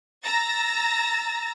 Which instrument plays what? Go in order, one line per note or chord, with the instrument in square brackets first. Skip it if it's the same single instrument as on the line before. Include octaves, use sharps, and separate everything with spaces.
[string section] A#5 E6 A6 A#6